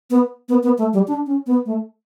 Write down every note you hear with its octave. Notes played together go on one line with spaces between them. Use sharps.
B3
B3
B3
A3
G3
D4
C#4
B3
A3